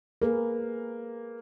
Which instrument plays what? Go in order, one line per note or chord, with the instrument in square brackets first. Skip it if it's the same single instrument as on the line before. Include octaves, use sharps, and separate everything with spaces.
[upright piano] A#3 [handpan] G#4 A#4 B4